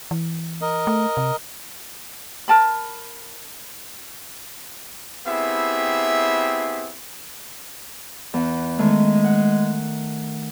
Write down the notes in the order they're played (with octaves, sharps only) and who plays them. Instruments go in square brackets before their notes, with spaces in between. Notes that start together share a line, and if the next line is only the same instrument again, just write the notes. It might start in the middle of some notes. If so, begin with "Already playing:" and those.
[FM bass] E3
[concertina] A#4 D#5
[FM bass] A3
C3
[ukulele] A#4 A5 B5
[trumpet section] B3 C4 E4 G4 G#4 E5
[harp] E2 F#5
[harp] D#3 A3 [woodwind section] G#3
[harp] F#5